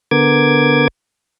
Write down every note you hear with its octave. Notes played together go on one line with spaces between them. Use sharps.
D3 B3 A#4 D6 G#6